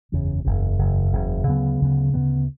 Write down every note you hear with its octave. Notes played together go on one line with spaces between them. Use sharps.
F#1 E2 C#3
F#1 E2 C#3
F#1 E2 C#3
F#1 E2 C#3
D2 C#3 F#3 B3
D2 C#3 F#3 B3
D2 C#3 F#3 B3